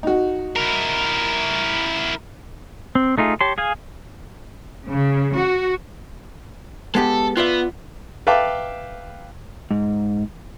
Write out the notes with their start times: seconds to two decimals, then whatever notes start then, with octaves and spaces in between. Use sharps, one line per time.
0.03 D#4 F#4
0.56 E4 A#4
2.95 C4
3.18 A3 D#4 F4 G#4
3.41 G4 C#5 A5 C6
3.58 G#4 F5 G#5
4.88 C#3
5.37 F#4
6.95 G#3 B3 G4 A4
7.37 B3 F4 D5 E5
8.27 B4 E5 F5 G5 A5 D6
9.71 G#2